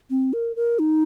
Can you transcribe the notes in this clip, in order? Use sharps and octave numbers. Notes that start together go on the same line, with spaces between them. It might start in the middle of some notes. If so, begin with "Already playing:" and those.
C4
A#4
A#4
D#4